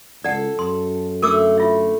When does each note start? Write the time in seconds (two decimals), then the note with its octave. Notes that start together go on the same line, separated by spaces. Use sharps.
0.24 C#2 A4 D5 F#5
0.59 F#2 C6
1.22 D3 A3 A#4 D6 E6
1.58 F4 E5